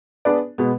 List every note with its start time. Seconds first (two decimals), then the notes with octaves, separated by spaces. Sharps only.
0.25 B3 D4 G#4 B4 D5
0.58 B2 G#3 B3